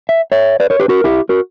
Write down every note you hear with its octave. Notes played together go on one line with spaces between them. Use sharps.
E5
C#5 E5
B4 D5
A#4 C#5
G4 B4
F#4 A#4
E4 G4
F#4 A#4